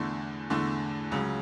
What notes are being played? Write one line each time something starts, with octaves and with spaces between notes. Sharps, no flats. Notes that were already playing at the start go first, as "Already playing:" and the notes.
Already playing: E2 D3 A3 D4
E2 D3 A3 D4
C#2 C#3 F#3